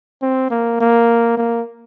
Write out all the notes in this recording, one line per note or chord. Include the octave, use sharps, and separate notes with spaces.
C4
A#3
A#3
A#3